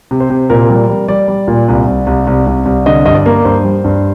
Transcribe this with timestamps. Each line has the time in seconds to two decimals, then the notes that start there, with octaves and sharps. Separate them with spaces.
0.11 C3
0.20 C5
0.30 C3
0.50 A#2 A#4
0.69 G3
0.89 G3
1.08 G3 D5
1.28 G3
1.48 A#2
1.68 C2
1.87 C2
2.07 C2
2.27 C2
2.47 C2
2.65 C2
2.86 D3 D#5
3.06 G2 D#5
3.15 D5
3.26 A#3
3.44 G2 C5
3.64 G3
3.84 G2